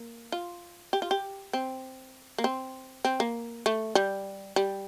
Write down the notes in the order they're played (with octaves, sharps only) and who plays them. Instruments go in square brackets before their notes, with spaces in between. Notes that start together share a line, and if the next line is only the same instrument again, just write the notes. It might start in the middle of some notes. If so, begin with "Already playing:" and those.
Already playing: [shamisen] A#3
F4
G4
F4
G4
C4
A#3
C4
C4
A#3
A3
G3
G3